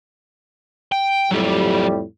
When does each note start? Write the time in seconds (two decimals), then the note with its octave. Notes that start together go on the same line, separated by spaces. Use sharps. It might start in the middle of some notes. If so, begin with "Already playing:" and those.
0.92 G5
1.31 F2 A2 F#3 G3 G4